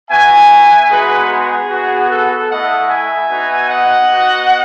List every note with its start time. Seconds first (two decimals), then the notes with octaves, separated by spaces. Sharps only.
0.10 B3 F#4 E5 G#5
0.90 G#3 B3 D#4 F#4 G#4 B4
1.31 G#4
1.70 B3 F#4
2.10 A4
2.49 A3 E4 D#5 F#5
2.89 E5 G#5
3.30 B3 D#4 F#4
3.69 D#5 F#5
4.09 B3 D#4 F#4